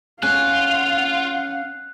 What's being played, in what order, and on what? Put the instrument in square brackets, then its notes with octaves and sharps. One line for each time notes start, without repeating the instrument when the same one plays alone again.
[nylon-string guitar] C#4 G#4 G#5 [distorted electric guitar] F4 [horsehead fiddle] F5 F#5 [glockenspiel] F#6